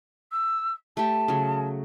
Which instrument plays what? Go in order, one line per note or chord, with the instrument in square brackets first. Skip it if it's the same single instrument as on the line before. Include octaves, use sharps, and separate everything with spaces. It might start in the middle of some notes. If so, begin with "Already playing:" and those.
[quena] E6
[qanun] A3 G4 [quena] A5
[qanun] C#3 F#3